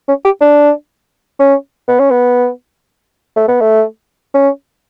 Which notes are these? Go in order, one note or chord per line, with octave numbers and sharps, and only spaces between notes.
C#4
G4
D4
C#4
B3
C#4
B3
A3
B3
A3
C#4